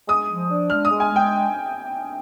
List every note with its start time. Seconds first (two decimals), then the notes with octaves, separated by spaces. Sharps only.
0.08 G#3 D#6
0.29 F3
0.50 D4
0.70 G#3 F6
0.85 D#6
0.91 G#3
1.00 G#5
1.11 G#3 G5